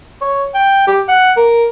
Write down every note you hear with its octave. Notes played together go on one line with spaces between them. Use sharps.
C#5
G5
G4
F#5
A#4